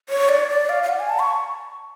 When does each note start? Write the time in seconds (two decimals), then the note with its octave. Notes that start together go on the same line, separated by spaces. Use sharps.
0.09 C#5
0.29 D5
0.49 D5
0.69 F5
0.83 F5
0.89 F#5
1.00 G#5
1.09 A5
1.19 C#6